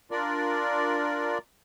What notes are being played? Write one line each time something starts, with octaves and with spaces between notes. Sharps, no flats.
D4 F4 A#4 D5